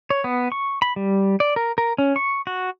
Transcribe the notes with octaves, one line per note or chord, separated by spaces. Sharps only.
C#5
B3
C#6
B5
G3
D5
A#4
A#4
C#4
C#6
F#4